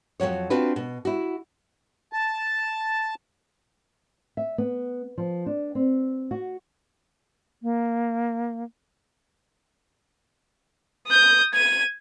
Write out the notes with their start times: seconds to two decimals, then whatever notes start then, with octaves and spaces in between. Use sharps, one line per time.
0.20 F2 E3 F#3 C#5
0.50 C4 D4 F4 F#4 B4
0.76 B2
1.05 E4 F#4
2.13 A5
4.37 E5
4.58 B3
5.18 F3
5.46 D4
5.75 C4
6.31 F#4
7.63 A#3
11.08 D#6 G6
11.53 G#6 D#7